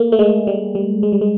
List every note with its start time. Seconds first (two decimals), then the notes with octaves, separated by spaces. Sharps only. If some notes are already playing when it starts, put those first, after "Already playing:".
Already playing: A3 A#3
0.12 A3
0.19 G#3
0.47 G3
0.75 G3
1.03 G#3
1.12 G3
1.21 G#3